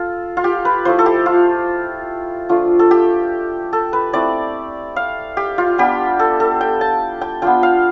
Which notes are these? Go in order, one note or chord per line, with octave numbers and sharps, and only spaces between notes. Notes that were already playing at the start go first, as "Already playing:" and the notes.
Already playing: F4 A4
F4
G4
B4
F3 A3 E4 C5
A4
G4
F4
F3 A3 D4 F4
A4
G4
A4
B4
A3 C4 E4 D5
F5
G4
F4
G3 B3 D4 G4
A4
A4
G5
A5
G5
B3 D4 F4 G5
F5